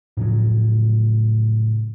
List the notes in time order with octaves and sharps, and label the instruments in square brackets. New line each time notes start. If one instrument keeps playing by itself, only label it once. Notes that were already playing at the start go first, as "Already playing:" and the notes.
[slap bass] A2 C#3 F3 F#3